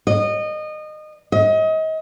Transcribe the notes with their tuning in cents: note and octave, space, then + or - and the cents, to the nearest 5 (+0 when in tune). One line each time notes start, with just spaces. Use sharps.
D#5 -25
D#5 +30